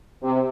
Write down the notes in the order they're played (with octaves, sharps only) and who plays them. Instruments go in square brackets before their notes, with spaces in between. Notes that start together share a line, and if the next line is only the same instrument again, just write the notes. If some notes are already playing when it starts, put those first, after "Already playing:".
[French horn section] C3